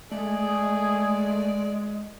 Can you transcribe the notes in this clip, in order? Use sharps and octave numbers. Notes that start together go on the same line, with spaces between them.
G#3 A3 G#4 D5